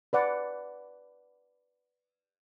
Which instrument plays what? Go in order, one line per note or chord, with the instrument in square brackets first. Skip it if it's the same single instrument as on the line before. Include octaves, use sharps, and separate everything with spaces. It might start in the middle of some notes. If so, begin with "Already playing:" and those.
[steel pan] B4 D5 F#5